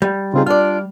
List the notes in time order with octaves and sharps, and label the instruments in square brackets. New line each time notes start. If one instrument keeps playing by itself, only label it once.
[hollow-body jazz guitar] G3
[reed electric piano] C#3 C4 G#4 [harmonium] D#4 F4
[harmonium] D4 [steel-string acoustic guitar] F4 D5 [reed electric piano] F6